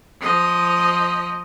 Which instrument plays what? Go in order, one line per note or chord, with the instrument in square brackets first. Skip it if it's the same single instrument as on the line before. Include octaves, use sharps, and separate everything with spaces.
[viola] F3 D#5